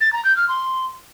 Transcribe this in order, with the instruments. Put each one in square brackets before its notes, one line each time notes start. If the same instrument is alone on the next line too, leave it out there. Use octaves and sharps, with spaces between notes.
[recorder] A6
A#5
G6
F6
C6